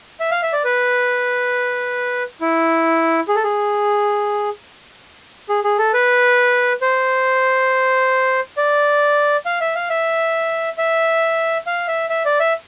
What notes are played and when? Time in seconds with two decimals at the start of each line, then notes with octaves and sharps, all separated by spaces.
0.20 E5
0.31 F5
0.42 E5
0.53 D5
0.65 B4
2.41 E4
3.28 G#4
3.35 A4
3.44 G#4
5.49 G#4
5.64 G#4
5.79 A4
5.93 B4
6.81 C5
8.57 D5
9.46 F5
9.61 E5
9.75 F5
9.90 E5
10.78 E5
11.67 F5
11.88 E5
12.10 E5
12.25 D5
12.40 E5